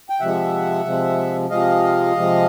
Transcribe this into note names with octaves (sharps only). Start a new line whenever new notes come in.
G5
C3 F3 G#3 E5 F#5
C3 F3 G#3
C3 F3 G#3 D#5 F5
C3 F3 G#3